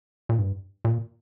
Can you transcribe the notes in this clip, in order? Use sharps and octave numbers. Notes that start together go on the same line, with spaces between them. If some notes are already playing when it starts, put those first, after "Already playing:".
A#2
G2
A#2